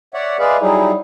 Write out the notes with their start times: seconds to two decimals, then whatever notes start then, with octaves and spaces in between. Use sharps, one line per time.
0.14 C#5 D5 E5 F#5
0.39 G#3 G#4 B4 D5 E5 F5
0.61 F#3 G3 D#4 E4 G#4